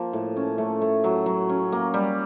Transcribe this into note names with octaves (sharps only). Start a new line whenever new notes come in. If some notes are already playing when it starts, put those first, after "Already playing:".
Already playing: F3 A#3
A2
C#4
A3
A3
F#3
F#3
C#4
A#3
G3